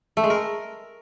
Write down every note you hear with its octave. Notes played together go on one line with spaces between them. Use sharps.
A3
G#3
A#4